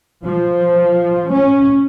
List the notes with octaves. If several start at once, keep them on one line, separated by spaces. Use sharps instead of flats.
F3
C#4